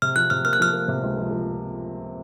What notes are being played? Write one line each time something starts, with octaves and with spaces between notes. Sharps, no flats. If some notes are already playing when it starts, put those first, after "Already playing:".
C3 F6
F3 F#6
C3 F6
A#3 F6
F#6
F3 F6
A#3
C3
C#2
F3
F3